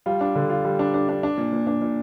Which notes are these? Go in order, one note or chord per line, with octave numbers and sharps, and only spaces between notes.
G3 F4
D4
D3
F4
G3
D4
D4
D4
D4
A#2
A#2
D4
A#2